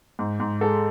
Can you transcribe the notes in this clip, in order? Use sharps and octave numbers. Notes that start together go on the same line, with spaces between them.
G#2
G#2
G#3 A4